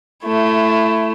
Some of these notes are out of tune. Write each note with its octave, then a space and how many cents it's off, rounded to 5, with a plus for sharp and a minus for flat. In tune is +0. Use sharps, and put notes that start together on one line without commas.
A3 +5 E4 +20